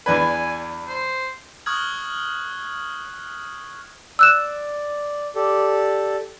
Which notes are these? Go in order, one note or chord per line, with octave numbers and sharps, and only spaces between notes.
E2 D4 B4 G#5
C5
C#6 D#6 F6 F#6 G#6 F#7
D5 E6 F#6 E7
G4 A4 D5